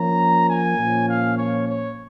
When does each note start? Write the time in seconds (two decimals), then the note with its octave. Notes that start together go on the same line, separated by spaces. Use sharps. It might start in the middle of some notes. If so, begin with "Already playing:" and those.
Already playing: F3 A#3 C#4 A#5
0.47 G#5
0.77 A#2 F3 C#4
1.07 F5
1.37 C#5
1.66 C#5